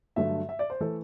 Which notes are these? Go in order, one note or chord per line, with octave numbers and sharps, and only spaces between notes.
G2 D3 F#3 A3 E5
E5
D5
C5
E3 A3 A4